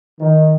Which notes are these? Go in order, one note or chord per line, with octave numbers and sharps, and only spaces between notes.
D#3